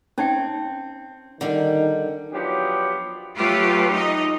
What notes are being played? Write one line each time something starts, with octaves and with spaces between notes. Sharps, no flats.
C4 C#4 D#4 G5
D3 D#3 G3
F3 F#3 B3 D4 G4
F#3 A3 F4 G4 B4
D#4 D#5